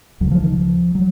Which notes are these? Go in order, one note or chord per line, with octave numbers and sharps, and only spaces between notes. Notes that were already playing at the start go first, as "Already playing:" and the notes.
C#2 C#3 F#3
F3
D#3
F3
F#3